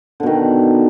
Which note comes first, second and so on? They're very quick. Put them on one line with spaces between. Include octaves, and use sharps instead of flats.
D3 B2 D#3